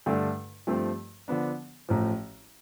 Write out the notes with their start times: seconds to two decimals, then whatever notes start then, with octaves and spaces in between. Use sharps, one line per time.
0.06 G2 D3 A3 D4 A4
0.67 G2 F3 A3 C4 G4
1.28 D3 F3 B3 D4
1.89 A1 A2 F3